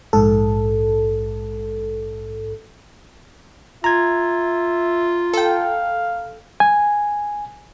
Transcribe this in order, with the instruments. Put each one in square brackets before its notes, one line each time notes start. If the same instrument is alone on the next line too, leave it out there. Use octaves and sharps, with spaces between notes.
[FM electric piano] A#1 G#2 A4
[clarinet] F4 [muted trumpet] E5 [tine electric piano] A#5 G#6
[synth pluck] A4 G5 [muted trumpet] F5
[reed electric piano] G#5